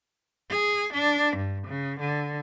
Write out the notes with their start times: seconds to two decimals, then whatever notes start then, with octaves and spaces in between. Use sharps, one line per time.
0.51 G#4
0.93 D4
1.37 G2
1.67 C#3
2.00 D3